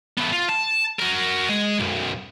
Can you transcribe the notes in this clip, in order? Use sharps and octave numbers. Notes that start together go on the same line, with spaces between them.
A3 B3
F4
A5
F#4 A#4
G#3
B1 F#2